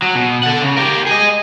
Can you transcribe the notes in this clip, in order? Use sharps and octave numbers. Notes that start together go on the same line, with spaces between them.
F#3
B2
A4 F#5
C#3
G4 A#4
G#4 D#5